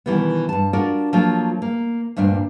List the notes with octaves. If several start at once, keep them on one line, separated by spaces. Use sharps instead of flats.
B2 D#3 E3 G3 B3
G2 A5
D4 F4 F#4 A#4 D5
F3 F#3 A3 A#3 F4
A#3
D2 G2 A#2 D4